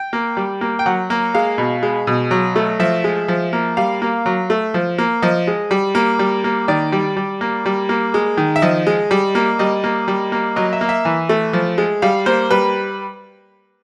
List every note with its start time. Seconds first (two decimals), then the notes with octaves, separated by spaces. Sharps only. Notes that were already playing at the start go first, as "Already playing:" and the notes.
Already playing: G5
0.13 A#3
0.37 G3
0.61 A#3
0.79 G5
0.86 F#3 F#5
1.10 A#3
1.34 G#3 F5
1.58 B2
1.83 G#3
2.07 B2
2.31 F#3
2.56 A3
2.80 F3 E5
3.04 G#3
3.28 F3
3.53 A#3
3.77 G3 F5
4.02 A#3
4.26 F#3
4.50 A3
4.74 F3
4.98 A#3
5.22 F3 D#5
5.47 G#3
5.71 G3
5.95 A#3
6.19 G3
6.44 A#3
6.68 D#3 D5
6.92 G3
7.17 G3
7.41 A#3
7.66 G3
7.89 A#3
8.14 G#3
8.37 D#3
8.56 E5
8.62 F3 D#5
8.87 G#3
9.11 G3
9.35 A#3
9.59 G3 D#5
9.84 A#3
10.08 G3
10.32 A#3
10.56 F#3 D#5
10.73 E5
10.81 A#3
10.89 E5
11.05 E3
11.29 A3
11.53 F3
11.78 G#3
12.02 G3 F5
12.26 A#3 C5
12.51 G3 B4